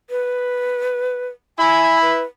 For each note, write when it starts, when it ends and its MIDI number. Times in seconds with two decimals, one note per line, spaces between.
0.10 1.27 71
1.59 2.22 64
1.59 1.98 80
1.59 2.22 83
2.02 2.23 71